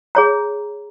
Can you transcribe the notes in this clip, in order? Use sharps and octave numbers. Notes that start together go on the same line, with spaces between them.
G#4 C#5 A#5